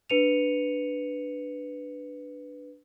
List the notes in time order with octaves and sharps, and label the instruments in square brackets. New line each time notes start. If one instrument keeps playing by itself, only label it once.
[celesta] D4 B4 C#7 D#7 F7